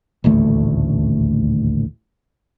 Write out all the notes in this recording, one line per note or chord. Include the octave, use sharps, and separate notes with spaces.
D#1 A1 D2 A3